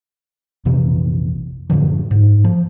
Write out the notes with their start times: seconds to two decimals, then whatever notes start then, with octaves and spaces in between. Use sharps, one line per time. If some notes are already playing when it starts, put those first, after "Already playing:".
0.65 A#1 F2 C3 E3
1.70 F#2 A2 D3 F3
2.11 G#2
2.44 F3